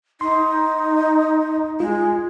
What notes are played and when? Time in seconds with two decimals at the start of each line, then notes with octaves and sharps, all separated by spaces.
0.21 D#4 C6
1.80 G#3 F4